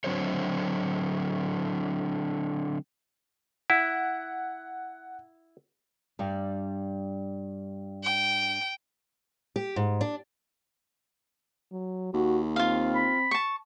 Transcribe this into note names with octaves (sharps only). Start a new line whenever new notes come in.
D3 F#3 C4 D4 C5 C#5
E4 F#5
G2 G3 D5
G5
G4
G#2
D4
F#3
D#2 F#4
C4 F4 F5
B5
A5 C#6